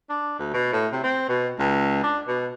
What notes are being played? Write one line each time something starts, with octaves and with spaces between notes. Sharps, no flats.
D4
D2
B2
A2
C3
C4
B2
C#2
D4
B2